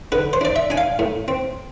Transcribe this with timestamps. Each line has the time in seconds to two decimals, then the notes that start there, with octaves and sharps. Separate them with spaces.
0.12 D3 B4
0.33 C5
0.41 D4 D5
0.56 E5
0.70 D4 G#5
0.77 F5
0.99 A2
1.28 C4